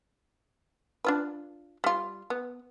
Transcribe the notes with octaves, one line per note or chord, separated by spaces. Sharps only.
D4 F4 B4
G3 F4
B3